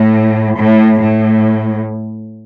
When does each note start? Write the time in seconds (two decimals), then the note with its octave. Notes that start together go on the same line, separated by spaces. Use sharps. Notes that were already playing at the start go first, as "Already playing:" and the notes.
Already playing: A2
0.57 A2
1.00 A2